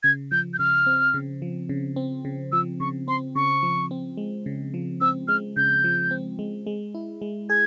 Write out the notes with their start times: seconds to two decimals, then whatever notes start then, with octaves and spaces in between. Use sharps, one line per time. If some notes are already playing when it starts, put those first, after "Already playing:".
0.03 C#3 G#6
0.31 F3 G6
0.54 G6
0.59 C#3 F6
0.86 C4
1.14 C#3
1.42 F3
1.69 C#3
1.96 C4
2.25 C#3
2.52 F3 E6
2.80 C#3 C#6
3.08 C4 C6
3.35 C#3 C#6
3.63 F3
3.91 C4
4.17 G#3
4.46 C#3
4.74 F3
5.01 C4 E6
5.28 G#3 F6
5.56 C#3 G6
5.84 F3
6.11 C4
6.39 G#3
6.67 G#3
6.95 E4
7.22 G#3
7.50 G#4 G#6